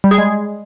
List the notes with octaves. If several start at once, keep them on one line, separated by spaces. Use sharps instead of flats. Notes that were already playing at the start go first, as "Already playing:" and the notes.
G3
G#4
G#3